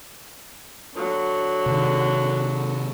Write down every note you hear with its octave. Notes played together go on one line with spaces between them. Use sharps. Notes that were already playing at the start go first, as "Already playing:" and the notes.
D3 F#3
C3 D#3